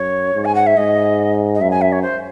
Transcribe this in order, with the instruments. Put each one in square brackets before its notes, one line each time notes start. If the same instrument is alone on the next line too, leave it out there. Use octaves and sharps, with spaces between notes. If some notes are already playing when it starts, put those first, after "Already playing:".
Already playing: [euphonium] F#2 [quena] C#5
[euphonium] G#2
[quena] G#5
F#5
E5
[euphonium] G#2 [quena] D#5
[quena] D#5
[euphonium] F#2 [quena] E5
[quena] G#5
E5
C#5
C5